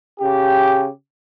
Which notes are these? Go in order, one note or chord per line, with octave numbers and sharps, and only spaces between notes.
C#3 G4